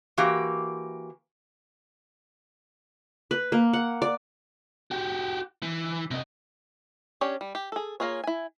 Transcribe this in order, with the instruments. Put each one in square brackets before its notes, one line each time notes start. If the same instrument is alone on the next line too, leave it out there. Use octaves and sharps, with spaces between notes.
[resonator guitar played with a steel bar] E3 A#3 F#4 G4
[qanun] B4
A#3
F#5
D5
[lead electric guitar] F#4 G4
E3
C3 D#5
[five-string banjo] C#4 D4 G4 C#5 D5
G3
G4
G#4 A4
A#3 F4 G#4 C#5
E4 G#5